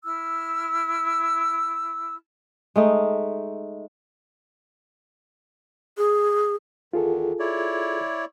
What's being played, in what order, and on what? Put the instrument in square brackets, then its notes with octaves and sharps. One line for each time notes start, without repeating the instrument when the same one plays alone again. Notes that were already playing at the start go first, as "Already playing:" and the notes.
[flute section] E4 E6 F6
[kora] G#3 A3 D#4
[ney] G#4
[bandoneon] E2 D#3 [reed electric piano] F4 G#4 A4
[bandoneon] E4 C#5 D5